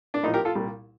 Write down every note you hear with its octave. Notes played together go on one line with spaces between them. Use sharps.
D4
A#1 A2 F3 D#4
G4 A#4
F4 A4
C2 A#2 G3